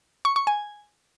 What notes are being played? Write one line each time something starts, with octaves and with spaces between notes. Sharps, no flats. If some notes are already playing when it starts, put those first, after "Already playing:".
C#6
C#6
G#5